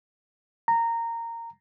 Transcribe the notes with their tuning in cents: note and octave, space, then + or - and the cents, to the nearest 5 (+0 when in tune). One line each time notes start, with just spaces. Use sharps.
A#5 -15